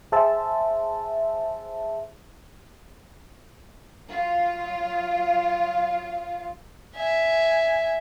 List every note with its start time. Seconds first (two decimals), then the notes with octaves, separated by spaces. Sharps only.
0.12 G#4 C5 E5 A5
4.06 F#3 F4
6.95 E5 G#5